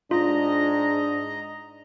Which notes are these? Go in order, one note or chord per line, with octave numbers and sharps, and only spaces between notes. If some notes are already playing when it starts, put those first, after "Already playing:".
G#2 D4 F4 D#5 A#5